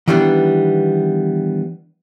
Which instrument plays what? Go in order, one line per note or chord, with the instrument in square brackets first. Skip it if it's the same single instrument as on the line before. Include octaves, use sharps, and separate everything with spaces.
[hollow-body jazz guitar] D#3 E3 G3 B3 C#4 D4